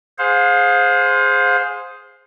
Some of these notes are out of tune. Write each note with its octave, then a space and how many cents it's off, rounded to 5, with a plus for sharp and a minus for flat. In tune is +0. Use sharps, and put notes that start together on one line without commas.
G#4 +0 C5 +0 F5 +35